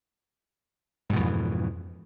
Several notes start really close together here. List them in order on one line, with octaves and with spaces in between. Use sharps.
G#2 B2 E3 F2